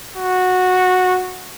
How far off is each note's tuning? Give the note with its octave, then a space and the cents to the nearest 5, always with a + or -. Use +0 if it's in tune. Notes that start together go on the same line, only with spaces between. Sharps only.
F#4 -10